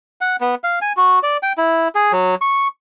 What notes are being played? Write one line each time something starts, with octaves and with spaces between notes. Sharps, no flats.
F#5
B3
F5
G#5
F#4
D5
G5
E4
G#4
F#3
C#6